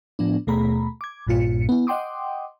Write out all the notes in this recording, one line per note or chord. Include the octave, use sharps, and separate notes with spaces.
A2 F3 B3 D4
D#2 B2 A3 G#4 A#5 B5
D6 G#6
A#1 G2 A#2 F4 C#7
B3 E4
D#5 F#5 G5 C6 D6 D#6